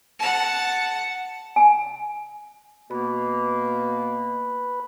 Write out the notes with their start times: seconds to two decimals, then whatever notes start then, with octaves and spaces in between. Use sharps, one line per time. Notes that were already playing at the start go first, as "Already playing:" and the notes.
0.19 F#5 A5
1.56 G#5
2.91 B2 A#3 B4